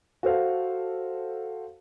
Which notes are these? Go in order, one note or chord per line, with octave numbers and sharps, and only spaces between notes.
F#4 A4 C5 F5